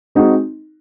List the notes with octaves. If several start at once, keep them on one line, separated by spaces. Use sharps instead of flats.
G#3 C4 D#4 F#4